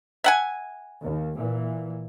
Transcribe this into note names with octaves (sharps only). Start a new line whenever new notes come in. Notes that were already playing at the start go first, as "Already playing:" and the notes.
E5 F#5 G#5
D#2
A#2 E3